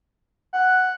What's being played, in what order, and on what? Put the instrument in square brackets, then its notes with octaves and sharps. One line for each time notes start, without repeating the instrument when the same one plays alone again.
[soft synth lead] F#5